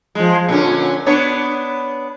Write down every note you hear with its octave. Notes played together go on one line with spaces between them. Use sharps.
F3 G#3
A#2 D3 C#4
B3 D4 C#5